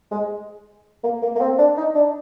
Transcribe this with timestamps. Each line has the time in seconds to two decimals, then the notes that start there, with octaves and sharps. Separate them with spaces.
0.12 G#3
1.04 A#3
1.23 A#3
1.36 A#3
1.41 C4
1.58 D4
1.78 D#4
1.95 D4